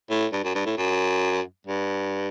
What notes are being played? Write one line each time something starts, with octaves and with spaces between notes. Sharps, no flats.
A2
G2
F#2
G2
A2
F#2
G2